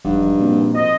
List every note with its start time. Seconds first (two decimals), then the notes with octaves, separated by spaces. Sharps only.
0.05 E1 G2 F3 D#4 F#5
0.40 A#2 C4 F#4 D5
0.75 C5 D#5